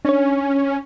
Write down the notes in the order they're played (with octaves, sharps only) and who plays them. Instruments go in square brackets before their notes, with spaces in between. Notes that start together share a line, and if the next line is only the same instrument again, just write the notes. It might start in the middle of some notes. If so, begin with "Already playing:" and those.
[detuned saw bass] C#4 [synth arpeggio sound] D4 C#5